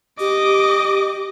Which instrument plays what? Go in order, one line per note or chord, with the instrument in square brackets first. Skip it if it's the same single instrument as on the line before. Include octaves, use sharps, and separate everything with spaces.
[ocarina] G4 [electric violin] D#5 D6